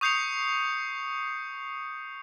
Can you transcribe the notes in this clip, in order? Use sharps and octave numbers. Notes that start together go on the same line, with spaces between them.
C#6 D#6 G6 C7 C#7 F7